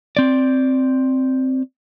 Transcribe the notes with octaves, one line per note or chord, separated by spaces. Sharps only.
C4 D5